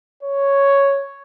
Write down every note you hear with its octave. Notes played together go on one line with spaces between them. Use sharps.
C#5